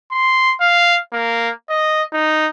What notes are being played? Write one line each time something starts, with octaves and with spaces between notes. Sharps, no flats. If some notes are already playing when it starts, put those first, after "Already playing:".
C6
F5
A#3
D#5
D#4